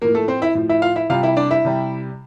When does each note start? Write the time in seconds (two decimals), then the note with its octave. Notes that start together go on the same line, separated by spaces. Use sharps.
0.02 A2 F3 A#3 A#4
0.14 A3 A4
0.28 C4 C5
0.42 E4 E5
0.55 A2 F3
0.69 E4 E5
0.82 F4 F5
0.96 E4 E5
1.09 C3 G3 F4 F5
1.23 E4 E5
1.37 D4 D5
1.51 E4 E5
1.65 C3 G3